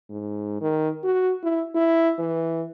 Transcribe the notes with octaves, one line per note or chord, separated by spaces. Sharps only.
G#2
D#3
F#4
E4
E4
E3